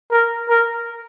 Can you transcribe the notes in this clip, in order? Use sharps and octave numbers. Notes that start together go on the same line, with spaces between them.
A#4
A#4